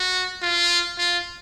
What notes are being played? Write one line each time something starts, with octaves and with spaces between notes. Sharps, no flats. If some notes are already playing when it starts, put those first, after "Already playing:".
Already playing: F#4
F4
F4